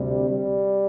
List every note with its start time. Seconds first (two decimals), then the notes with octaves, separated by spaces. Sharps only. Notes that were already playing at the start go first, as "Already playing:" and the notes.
Already playing: D2 C3 G3
0.30 G3